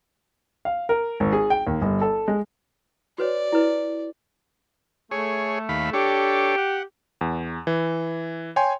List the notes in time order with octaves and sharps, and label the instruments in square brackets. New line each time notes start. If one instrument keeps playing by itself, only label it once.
[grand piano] F5
A#4
G#1
G#4
G5
D#2
G1
A4
G#3
[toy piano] F#4 B4 C#5 [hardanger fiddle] D5
[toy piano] E4 B4
[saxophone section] A3 [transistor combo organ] G#4 C#5
[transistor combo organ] D#2 F5 B5
[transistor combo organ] D4 A4 C#5 [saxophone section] G4
[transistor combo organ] F#5
[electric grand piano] E2
E3
C#5 G5 G#5 C6